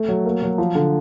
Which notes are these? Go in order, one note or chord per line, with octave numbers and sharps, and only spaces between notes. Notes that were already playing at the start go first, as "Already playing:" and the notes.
Already playing: A3
F#3
A#3
F#3
F3
D3